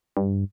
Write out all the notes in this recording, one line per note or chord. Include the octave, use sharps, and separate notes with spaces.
G2